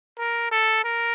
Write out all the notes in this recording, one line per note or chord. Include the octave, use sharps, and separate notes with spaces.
A#4
A4
A#4